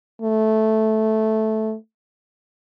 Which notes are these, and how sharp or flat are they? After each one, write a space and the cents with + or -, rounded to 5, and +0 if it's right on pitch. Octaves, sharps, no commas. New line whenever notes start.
A3 -10